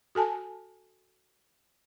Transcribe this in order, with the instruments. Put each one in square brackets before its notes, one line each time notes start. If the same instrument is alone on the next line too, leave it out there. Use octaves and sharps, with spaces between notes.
[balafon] F#4 A4 G#5 A5